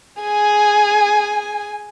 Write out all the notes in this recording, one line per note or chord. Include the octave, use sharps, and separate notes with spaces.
G#4 G#5